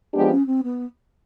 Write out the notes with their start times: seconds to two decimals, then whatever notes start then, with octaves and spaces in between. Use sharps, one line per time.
0.14 F3 G#3 B3 D4 G4
0.31 C#4
0.46 C4
0.63 B3